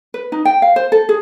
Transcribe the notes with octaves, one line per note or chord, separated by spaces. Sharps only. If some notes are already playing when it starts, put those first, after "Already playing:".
B4
D#4
G5
F5
C5
A4
G#4